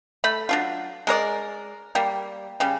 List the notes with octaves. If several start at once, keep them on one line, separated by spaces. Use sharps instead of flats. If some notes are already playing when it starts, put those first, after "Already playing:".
A3 B5
F#3 D4 F4
G#3 A#4 C#5 D5
G3 A#3
C#3 G3